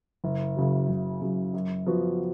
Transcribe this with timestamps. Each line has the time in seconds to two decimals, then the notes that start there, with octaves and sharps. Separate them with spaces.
0.24 F#1
0.57 F#2 C#3 F#3
0.89 F#1
1.21 F#2 C#3 F#3
1.54 F#2
1.86 F3 B3 F#4